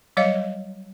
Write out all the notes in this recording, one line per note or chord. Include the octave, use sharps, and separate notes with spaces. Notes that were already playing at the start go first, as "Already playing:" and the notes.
F#3 G3 C#5 D#5 F5